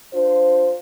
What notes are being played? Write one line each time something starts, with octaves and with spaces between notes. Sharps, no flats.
D4 F4 C5